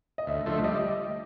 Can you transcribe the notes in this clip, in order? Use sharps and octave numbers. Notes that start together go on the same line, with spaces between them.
D#5
D2 E5
D3 F3 A3
G3 D#5